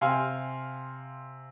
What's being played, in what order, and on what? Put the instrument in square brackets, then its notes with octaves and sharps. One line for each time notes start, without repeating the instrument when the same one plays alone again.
[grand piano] C3 F5 G#5 C6